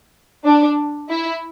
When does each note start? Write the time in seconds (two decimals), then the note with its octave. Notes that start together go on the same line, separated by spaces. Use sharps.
0.44 D4
1.09 E4